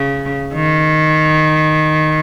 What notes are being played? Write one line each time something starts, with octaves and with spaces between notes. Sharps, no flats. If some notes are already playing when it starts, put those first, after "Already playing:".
Already playing: C#3
D#3